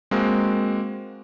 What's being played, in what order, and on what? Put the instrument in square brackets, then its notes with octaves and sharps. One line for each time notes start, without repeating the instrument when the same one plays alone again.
[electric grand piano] G#3 A#3 C4 F#4